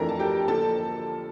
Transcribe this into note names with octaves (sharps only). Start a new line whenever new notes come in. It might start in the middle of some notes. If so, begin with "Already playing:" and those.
Already playing: F2 E3 A3 D4 A#4 A#5
A5
G4 G5
D3 F3 A#3 A4 A5